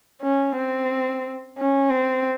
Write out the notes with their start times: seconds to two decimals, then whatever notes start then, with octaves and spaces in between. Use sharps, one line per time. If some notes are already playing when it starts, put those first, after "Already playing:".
0.22 C#4
0.56 C4
1.58 C#4
1.90 C4